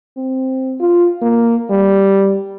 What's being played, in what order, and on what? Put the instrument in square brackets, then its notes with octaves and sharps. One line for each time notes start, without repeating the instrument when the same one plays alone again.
[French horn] C4
F4
A#3
G3